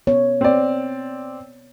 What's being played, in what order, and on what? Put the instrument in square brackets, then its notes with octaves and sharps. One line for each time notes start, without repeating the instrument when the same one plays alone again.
[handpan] B3 C#5
[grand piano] C4 D5